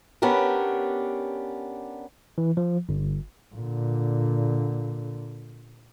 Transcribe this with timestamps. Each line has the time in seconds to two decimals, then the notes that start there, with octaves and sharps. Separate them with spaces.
0.22 B3 C#4 D4 G4 A#4
2.38 E3
2.57 F3
2.89 G1
3.55 A#2 D3